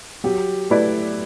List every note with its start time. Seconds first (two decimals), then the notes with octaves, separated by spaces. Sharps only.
0.24 F#3 G4
0.70 A3 E4 B4 D5